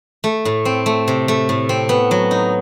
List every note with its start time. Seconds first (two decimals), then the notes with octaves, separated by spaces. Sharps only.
0.24 A3
0.45 A2
0.65 C4
0.86 A3
1.08 C3
1.28 A3
1.49 A2
1.69 C4
1.89 B3
2.11 F#3
2.31 D#4